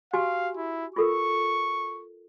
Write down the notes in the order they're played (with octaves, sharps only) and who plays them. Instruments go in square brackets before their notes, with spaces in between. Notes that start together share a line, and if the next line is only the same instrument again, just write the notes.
[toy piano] F#4 G4 G#5 [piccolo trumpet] F5
[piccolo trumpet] E4
[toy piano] F4 A4 A#4 [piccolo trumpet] C#6